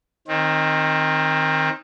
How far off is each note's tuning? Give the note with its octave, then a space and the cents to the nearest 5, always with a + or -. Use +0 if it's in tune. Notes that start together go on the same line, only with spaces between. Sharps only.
D#3 +0 C4 +25